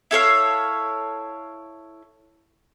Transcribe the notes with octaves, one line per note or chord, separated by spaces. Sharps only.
E4 A4 C#5 F5